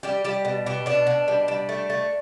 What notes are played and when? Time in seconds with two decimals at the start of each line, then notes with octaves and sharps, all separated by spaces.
0.03 G3 G4
0.24 G3 G4
0.45 B2
0.66 B2 G4
0.86 B2 D4
1.07 B2
1.28 G3
1.48 G3
1.69 A3
1.90 A3